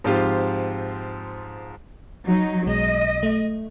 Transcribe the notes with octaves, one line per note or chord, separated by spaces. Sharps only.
G#2 F3 C4 F4 G4
F#3 D#4
B1 B2 G#3 D#5
A3